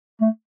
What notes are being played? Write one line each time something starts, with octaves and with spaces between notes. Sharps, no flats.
A3